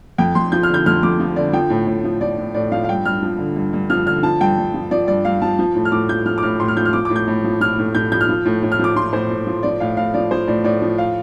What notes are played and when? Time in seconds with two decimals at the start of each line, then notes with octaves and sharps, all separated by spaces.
0.18 F2 G5
0.35 F2 C6
0.52 F3 G6
0.63 F6
0.69 D3 G6
0.86 F2 F6
1.03 F2 D6
1.20 F3
1.36 D3 D5
1.53 F3 G5
1.70 A2
1.87 A2
2.04 F3
2.21 F3 D5
2.38 A2
2.55 A2 D5
2.72 F3 F5
2.84 F5
2.89 G2 G5
3.05 G2 F6
3.22 F3
3.39 D3
3.56 G2
3.73 G2
3.90 F3 F6
4.06 D3 F6
4.23 F3 A5
4.41 G2 G5
4.58 G2
4.74 F3
4.91 F3 D5
5.08 G2 D5
5.25 G2 F5
5.42 F3 A5
5.59 F3
5.75 A2
5.85 F6
5.92 A2 D6
6.09 F3 G6
6.26 F3 F6
6.38 D6
6.43 A2 F6
6.60 A2 C6
6.68 F6
6.77 F3 G6
6.85 F6
6.93 F3 D6
7.05 A2 D6
7.16 G6
7.28 A2
7.44 F3
7.60 F3 F6
7.78 A2
7.95 A2 G6
8.12 F3 G6
8.21 F6
8.29 F3
8.46 A2
8.63 A2
8.72 F6
8.79 F3 D6
8.96 F3 C6
9.13 A2 C5
9.30 A2
9.47 F3
9.63 F3 D5
9.80 A2 F5
9.97 A2 F5
10.14 F3 D5
10.31 F3 C5
10.47 A2 D5
10.64 A2 D5
10.82 F3
10.98 F5